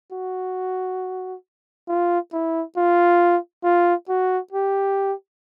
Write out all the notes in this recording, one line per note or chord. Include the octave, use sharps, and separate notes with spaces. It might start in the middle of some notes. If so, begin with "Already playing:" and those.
F#4
F4
E4
F4
F4
F#4
G4